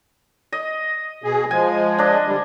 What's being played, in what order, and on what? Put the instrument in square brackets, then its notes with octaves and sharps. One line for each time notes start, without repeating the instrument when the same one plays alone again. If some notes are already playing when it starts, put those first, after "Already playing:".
[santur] D#5
[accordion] B2 G#4
[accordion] F3 G#3 [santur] G#5
[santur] D4 D#5
[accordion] D3 G3